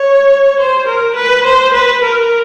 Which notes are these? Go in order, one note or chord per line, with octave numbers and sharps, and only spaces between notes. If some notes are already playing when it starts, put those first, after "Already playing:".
Already playing: C#5
C5
A#4
B4
C5
B4
A#4